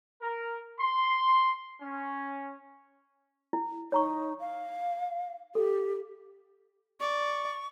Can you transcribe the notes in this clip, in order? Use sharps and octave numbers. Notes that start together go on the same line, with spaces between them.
A#4
C6
C#4
E4
D#4 C#5 A#5 C#6
F5
G4 A4
D5 C#6